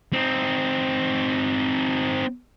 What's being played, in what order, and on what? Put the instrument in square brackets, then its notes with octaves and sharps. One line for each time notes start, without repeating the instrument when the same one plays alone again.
[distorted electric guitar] C4 D#4